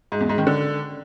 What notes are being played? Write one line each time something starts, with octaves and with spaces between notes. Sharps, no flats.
G#2
E2
G#2
D#3
D3